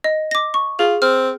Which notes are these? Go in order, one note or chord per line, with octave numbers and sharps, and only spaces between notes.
D#5
D6 A#6
C#6
F4 G#4
C4 F6